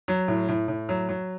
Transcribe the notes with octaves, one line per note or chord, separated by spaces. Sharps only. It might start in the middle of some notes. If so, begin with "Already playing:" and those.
F#3
A2
A2
A2
F#3
F#3